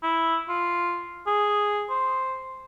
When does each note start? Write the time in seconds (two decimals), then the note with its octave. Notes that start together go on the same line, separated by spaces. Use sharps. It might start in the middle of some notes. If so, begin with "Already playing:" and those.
0.03 E4
0.49 F4
1.27 G#4
1.90 C5